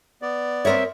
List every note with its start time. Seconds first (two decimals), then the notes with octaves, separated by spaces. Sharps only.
0.22 B3 D5
0.65 C4 A#4 C#5 E5